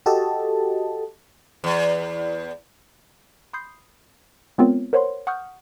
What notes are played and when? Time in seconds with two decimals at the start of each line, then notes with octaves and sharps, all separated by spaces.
0.06 F#4 G4 A4 D#5 A5
1.64 E2
3.53 B5 C6 D#6 G6 C7
4.58 G#3 B3 C4 F4 A#4 C#5
4.93 A#4 C5 C#5 F#5 B5 C6
5.27 F#5 C#6 D#6 F6 G6